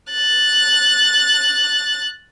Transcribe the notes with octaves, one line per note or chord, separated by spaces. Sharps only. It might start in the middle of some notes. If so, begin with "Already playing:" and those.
F#6 A6